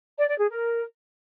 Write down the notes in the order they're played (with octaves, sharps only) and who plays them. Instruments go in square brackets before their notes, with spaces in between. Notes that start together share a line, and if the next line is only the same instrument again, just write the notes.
[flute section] D5
D5
G#4
A#4